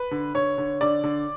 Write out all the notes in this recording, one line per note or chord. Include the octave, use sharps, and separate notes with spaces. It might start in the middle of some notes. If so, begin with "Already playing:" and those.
Already playing: B4
D3
D3 C#5
D3
D3 D5
D3